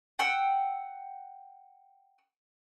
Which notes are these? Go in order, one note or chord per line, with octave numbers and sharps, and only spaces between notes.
F#5 G5 E6